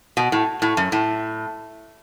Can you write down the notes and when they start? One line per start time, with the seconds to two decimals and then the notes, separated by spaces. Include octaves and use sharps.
0.17 B2
0.32 A2
0.62 A2
0.77 F#2
0.92 A2